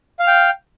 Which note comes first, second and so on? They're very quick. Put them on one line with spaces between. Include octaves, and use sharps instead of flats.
F5 F6 G5